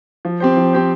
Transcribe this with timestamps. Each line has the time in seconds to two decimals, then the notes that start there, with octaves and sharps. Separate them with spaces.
0.25 F3
0.40 C4 G4 C5
0.57 F3
0.73 C4 G4 C5